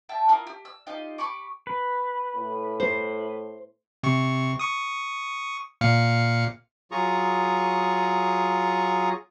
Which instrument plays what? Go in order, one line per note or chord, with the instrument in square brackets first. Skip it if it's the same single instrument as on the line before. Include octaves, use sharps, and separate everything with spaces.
[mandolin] E5 G5 A5
E4 F4 A#4 D#6
G4
E6
D#4 F4 G4 D#5
G4 B5 C#6 D6
[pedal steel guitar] B4
[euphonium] A2
[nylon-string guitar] C5
[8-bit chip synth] C3 C#6
C#6 D#6
A#2 F5 C#7
[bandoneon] F#3 F4 G#4 A#5 C#6 D#6